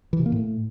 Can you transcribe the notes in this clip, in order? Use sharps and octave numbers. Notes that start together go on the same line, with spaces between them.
E3
C3
A#3
A2